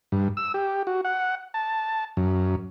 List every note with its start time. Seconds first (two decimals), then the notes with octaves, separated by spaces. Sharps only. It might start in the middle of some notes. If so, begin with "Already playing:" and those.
0.12 G2
0.37 E6
0.54 G4
0.87 F#4
1.05 F#5
1.54 A5
2.17 F#2